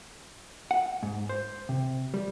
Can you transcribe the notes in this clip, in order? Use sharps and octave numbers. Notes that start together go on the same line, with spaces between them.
F#5
G#2
C5
C3
G3